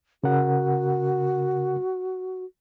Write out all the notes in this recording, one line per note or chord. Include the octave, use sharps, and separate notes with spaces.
C#3 F#4 A#4 F#5